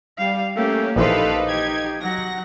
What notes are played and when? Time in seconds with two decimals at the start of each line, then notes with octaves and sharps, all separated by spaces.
0.18 G3 F5
0.56 A3 A#3 C#4 G4
0.96 A#1 E3 D#4 G4 A4 B4 C5 F5
1.47 G4 G#6
2.00 F#3 F#5 A#6